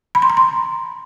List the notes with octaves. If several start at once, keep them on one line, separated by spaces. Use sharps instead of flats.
B5
C6
A#5
C6